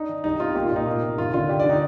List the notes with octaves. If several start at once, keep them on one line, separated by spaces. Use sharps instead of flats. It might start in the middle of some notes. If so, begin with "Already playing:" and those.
Already playing: D4 D#4
D#3
C2 D#4
C3 F4
A#3 G4
F4
A#2 D#4
A#3
C3
D#2 F4
D3 F4
D4 G4
D5
D3
D#4